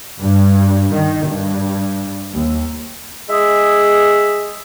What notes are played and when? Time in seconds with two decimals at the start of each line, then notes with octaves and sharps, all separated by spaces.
0.20 G2
0.92 D#3
1.26 G2
2.32 D#2
3.29 G#3 G#4 E5